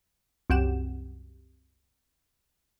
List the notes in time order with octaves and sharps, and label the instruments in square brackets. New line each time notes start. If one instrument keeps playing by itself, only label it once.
[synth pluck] C2 F#2 G4 F#5 E7